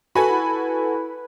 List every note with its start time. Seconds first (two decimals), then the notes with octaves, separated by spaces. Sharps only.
0.15 F#4 A4 B4 G#5 B5
0.30 E4